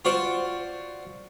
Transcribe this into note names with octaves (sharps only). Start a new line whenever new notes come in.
F4 F#4 C5 D5